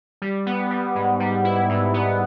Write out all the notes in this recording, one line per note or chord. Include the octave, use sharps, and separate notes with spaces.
G3
B3
G3
G#2
G3
E4
G#2
B3